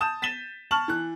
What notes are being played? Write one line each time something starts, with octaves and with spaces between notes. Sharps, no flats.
A5 D#6 G6 E7
A6 B6 D#7 E7 G7
A5 C#6 F6 F#7
E3 F#6